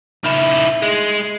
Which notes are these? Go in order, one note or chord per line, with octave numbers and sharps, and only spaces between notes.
D#3 E4
G#3